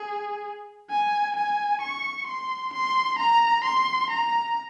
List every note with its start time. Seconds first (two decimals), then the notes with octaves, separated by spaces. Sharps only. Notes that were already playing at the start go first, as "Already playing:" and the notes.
Already playing: G#4
0.90 G#5
1.36 G#5
1.82 C#6
2.27 C6
2.73 C6
3.19 A#5
3.64 C6
4.10 A#5